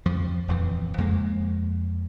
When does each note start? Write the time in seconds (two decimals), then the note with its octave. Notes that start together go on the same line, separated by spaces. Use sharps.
0.06 F2 F3
0.48 D#1 F2 E3
0.98 F2 F3 G#3 A#3